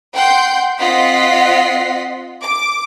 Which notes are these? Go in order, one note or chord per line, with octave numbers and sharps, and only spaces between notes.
F#5 G5 C6 G6
C4 F4 D#5 F#5 B6 C7
D6